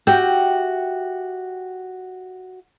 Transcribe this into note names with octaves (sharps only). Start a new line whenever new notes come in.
F#4 G4 E5 G5